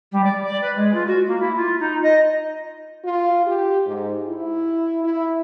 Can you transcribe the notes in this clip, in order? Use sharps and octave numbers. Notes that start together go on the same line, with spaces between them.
G3
D5
D5
B4
G#3
F4
F#4
A#3
E4
F4
D#4
D#5
F4
G4
G#2
E4
E4